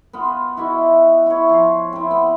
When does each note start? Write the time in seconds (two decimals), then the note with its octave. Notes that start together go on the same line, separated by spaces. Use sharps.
0.13 B3 F4
0.57 E4 F#4 D#5 E5
1.26 E4 C#5
1.49 F3 F5
1.93 C4 E4
2.11 B3